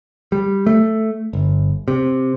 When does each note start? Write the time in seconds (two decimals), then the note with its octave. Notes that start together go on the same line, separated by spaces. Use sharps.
0.32 G3
0.66 A3
1.33 G1
1.88 C3